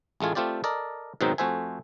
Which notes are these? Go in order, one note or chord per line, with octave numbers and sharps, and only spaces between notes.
A1 G#3 A3 F4 G#4
A3 C4 F4 G4 D5
A4 A#4 D5 D#5
G#2 B2 D#3 F#3 C4 D#4
F2 A3 F#4 C5 E5 G#5